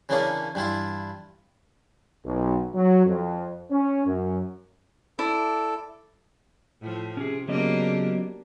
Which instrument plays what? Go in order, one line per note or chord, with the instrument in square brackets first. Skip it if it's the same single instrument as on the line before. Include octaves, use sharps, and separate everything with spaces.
[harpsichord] C#3 E3 A#3 C#4 D4 G#4
G2 E3 E4 F4
[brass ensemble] B1
F#3
F2
C#4
F#2
[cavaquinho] E4 D5 [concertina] A4
[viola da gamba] A2 F3
[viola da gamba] C3 [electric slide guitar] C#4 G#4
[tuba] C#3 [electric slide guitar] F#3 B3 D#5 [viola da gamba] A#3 D4 G4